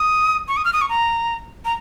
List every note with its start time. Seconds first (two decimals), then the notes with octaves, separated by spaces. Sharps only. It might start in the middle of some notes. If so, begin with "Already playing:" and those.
Already playing: D#6
0.48 C#6
0.57 D#6
0.65 F6
0.73 D#6
0.81 C#6
0.89 A#5
1.65 A#5